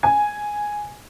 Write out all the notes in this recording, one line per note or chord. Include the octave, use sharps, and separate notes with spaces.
G#5